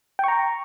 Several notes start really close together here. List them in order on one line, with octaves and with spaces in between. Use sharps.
G5 C#6 A#5